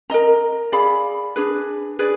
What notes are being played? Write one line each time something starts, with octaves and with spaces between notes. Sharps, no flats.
A#4 D#5 A#5
G#4 D5 F5 B5
D4 G#4 B4
G#4 B4 D5